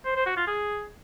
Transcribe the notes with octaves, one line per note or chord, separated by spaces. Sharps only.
C5
C5
F#4
F4
G#4